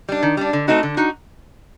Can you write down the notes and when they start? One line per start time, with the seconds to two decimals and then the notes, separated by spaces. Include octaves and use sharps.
0.09 G3 D4
0.23 D#3
0.37 G3 D4
0.53 D3
0.68 A3 C4 D#4 F#4
0.83 D3
0.97 D#4 F#4